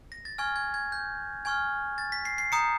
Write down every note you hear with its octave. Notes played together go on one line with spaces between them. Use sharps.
A#6
A6
G#5 C#6 F6 G#6
G#6
G#6
G6
G#5 C#6 F6 G#6
A6
B6
C7
C7
A#5 D#6 G6 C#7